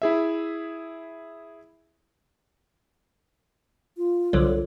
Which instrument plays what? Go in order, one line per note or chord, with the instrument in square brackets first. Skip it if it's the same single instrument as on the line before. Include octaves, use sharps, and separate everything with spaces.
[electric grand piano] E4 G#4 E5
[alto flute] F4
[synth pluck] C2 D3 F#3